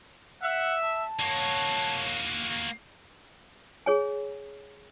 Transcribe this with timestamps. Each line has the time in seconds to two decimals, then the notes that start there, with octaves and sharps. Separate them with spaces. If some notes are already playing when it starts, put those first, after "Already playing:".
0.43 E5 F#5
0.84 A5
1.19 A#3 F#4 C#5
3.86 G#4 C#5 G#5